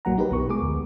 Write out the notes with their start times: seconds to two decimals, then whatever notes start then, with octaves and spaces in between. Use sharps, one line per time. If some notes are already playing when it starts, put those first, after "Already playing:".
0.05 A#1 F#3 A#3 F#5 A#5
0.18 D#4 G4 A#4 B4
0.31 B1 B3 C#6
0.49 G#3 G#4 D6
0.62 D2